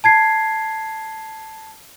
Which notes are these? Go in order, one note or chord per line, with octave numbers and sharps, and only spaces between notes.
A5 G#6 C7